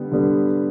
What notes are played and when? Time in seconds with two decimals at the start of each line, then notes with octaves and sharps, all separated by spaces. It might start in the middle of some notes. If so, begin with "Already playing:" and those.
Already playing: D3 G3 B3
0.12 D3 G3 B3